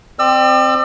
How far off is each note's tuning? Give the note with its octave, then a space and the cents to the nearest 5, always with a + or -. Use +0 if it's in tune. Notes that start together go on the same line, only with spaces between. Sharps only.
C4 +0 D5 +40 E6 +25